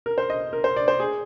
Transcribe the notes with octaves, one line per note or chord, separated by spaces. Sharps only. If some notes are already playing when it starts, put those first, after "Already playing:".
A#4
C5
D#5
A#4
C5
D5
C5
G#4